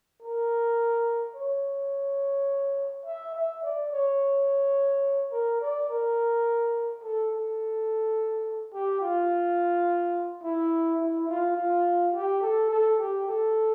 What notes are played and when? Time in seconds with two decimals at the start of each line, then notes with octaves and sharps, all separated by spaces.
0.22 A#4
1.36 C#5
3.06 E5
3.35 E5
3.63 D5
3.92 C#5
5.32 A#4
5.61 D5
5.90 A#4
7.04 A4
7.31 A4
8.74 G4
9.01 F4
10.43 E4
11.00 E4
11.29 F4
11.56 F4
12.14 G4
12.42 A4
12.70 A4
12.99 G4
13.27 A4